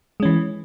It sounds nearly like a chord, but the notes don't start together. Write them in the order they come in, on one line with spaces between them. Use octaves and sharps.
G#3 C#4 E3